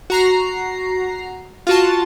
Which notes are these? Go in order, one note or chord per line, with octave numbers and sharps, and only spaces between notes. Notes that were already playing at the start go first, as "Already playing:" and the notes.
F#4 A#5 C7
F4 F#4 A5